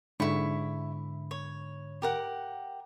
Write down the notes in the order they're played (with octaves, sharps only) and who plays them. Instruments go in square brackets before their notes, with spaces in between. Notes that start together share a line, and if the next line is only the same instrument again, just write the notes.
[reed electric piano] G#2 D3 B5 [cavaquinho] E4 C#6
[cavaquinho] C#5
G4 A#4 F#5